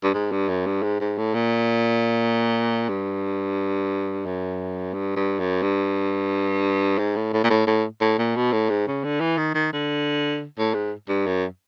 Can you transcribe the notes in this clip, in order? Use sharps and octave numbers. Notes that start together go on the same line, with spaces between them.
G2
G#2
G2
F#2
G2
G#2
G#2
A2
A#2
G2
F#2
G2
G2
F#2
G2
G#2
A2
A2
A#2
A2
A2
A2
A#2
B2
A2
G#2
C#3
D3
E3
D#3
D#3
D3
A2
G#2
G2
F#2